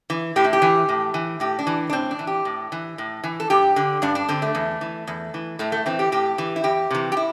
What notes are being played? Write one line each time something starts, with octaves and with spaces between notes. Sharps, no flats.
E3
A2 G4
E4
G4
E3
A2
E3
A2 G4
D4
E3
D4
A2 C4
D4
E3
G4
A2
E3
A2
E3
A4
G2 G4
D3
G2 D4
D4
D3 C4
A3
E2
E3
E2
E3
A2 A3
A3
E3 C4
G4
A2 G4
E3
E4
E2 G4
C3 E3
G4
E4